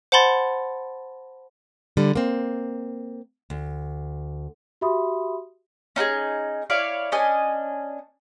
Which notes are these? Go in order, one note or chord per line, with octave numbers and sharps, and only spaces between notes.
C5 F#5 A5 B5 C6 A6
D3 G3
A#3 C4
D2
F#4 G4 E5 B5 C6 D#6
C#4 D#4 F#4 G#4
E4 C#5 D5 F5
C#4 D4 D#5 G#5